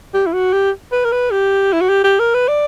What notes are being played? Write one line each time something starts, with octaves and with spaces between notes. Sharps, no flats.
G4
E4
F#4
G4
B4
A#4
B4
G4
E4
F#4
G4
G4
A#4
B4
D5